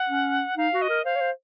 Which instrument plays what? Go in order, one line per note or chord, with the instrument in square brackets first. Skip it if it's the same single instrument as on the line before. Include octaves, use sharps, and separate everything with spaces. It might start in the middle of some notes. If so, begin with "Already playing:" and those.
Already playing: [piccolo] F#5
[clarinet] C#4
[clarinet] D#4 [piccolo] F5
[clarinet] F#4
[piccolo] D#5
[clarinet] A#4
[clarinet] C5 [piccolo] F5
[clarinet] C#5
C5